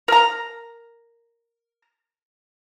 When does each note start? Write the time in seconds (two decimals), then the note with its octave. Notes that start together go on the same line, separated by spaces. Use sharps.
0.08 A#4 A#5